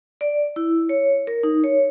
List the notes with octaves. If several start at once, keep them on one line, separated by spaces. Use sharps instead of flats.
D5
E4
C#5
A#4
D#4
C#5